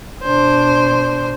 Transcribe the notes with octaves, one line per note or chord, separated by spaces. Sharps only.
B2 D4 C5